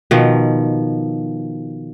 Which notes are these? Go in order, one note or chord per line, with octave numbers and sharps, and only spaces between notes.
B2 D#3 F3